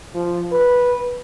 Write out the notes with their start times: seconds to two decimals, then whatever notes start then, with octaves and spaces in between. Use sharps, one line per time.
0.15 F3
0.52 B4